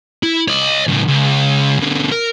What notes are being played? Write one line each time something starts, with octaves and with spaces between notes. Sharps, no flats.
E4
C#5 D#5
C#2 A2
C#2
B2 D3
A#4